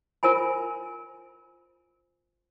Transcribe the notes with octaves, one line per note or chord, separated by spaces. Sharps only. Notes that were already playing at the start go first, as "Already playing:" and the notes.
F4 A#4 C5 G#5 B5